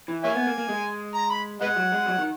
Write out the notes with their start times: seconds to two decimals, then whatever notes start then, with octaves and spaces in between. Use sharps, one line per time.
0.08 E3
0.24 A#3 C#5 E5 G#5
0.35 B3
0.47 A#3
0.58 A#3
0.69 G#3
1.15 A#5
1.30 B5
1.61 G#3 B4 D#5 F#5
1.76 F#3
1.92 G#3
2.06 F#3
2.18 D#3